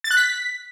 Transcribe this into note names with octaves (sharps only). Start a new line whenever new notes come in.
A6
F#6
B6